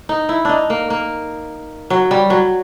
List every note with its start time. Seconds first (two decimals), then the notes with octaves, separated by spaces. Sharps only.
0.09 D#4
0.29 E4
0.45 D4 D#4
0.70 A#3
0.90 A#3
1.90 F#3
2.11 G3
2.30 F#3